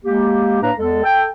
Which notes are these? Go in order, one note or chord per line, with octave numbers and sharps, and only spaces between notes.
G#3 A#3 G4
A2 A#3 D4 B4 F5 A#5
E2 G#3 A4
A4 G5